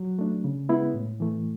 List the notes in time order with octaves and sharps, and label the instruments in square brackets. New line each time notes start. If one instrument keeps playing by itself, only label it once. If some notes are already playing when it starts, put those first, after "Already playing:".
Already playing: [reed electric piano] F#3
A3 D4
C#3
G#3 B3 E4
A2
E3 A3